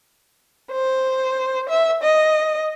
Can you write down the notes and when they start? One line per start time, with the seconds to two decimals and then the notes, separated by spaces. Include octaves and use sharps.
0.71 C5
1.68 E5
2.02 D#5